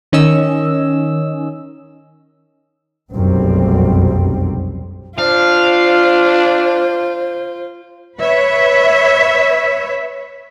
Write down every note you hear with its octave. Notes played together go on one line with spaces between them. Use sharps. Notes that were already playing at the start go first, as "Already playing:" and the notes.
D#3 C#4 D#5 E6
F1 B1 F#2 G3 C4
D4 F4 C5 F5
B4 C#5 E5